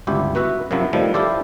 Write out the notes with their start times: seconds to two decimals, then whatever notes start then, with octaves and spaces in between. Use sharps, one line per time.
0.07 G1 C#2 E4 G4
0.35 B3 F#4 B4 E5
0.71 F#2 C3 F3 F#3 E4
0.93 A2 D#3 F3 G3
1.14 E4 F4 G4 A4 C5 D5